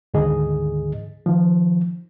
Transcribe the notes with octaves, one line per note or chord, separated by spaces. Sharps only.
D2 G#2 D3 D#3 G#4 D#5
D#3 F3